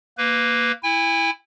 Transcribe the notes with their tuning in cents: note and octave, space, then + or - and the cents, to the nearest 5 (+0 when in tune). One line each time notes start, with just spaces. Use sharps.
A#3 +0 B4 +10
E4 +0 G#5 -45